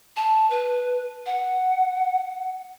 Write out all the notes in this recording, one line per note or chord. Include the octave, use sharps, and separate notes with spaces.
A5
B4
F#5